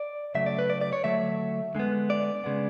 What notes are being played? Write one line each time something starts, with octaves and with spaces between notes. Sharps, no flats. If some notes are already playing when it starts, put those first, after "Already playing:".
Already playing: D5
C#3 F#3 A3 E5
D5
B4
D5
D5
C#5
D3 F#3 A3 E5
D3 G#3 B3
D5
C#3 G#3 B3